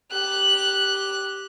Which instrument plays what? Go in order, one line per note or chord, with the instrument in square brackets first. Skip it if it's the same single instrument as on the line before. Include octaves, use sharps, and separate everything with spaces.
[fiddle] G4 F#6